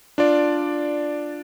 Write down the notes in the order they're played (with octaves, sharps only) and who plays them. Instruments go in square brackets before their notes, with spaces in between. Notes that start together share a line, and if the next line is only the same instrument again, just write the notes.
[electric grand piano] D4 F4 D5